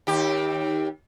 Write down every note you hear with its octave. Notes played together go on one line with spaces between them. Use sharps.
D#2 G4